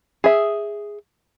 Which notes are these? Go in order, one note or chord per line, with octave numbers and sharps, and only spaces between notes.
G#4 E5